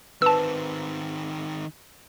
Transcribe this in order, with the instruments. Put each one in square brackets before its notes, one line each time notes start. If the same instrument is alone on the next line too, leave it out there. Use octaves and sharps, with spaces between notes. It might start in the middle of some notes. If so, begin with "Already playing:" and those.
[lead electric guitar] D#3 C4 [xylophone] B4 [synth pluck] A5 E6